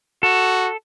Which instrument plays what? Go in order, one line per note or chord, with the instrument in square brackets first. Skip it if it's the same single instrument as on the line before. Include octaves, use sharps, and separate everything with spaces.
[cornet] F#4 [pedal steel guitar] A4